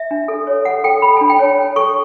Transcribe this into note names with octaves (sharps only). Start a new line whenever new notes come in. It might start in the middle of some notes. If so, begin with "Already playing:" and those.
Already playing: E5
D4
A4
C#5
A4 F#5
A4 G5
A4 B5
D4 A5
G5
C#5 A5
C#5
A4 C#6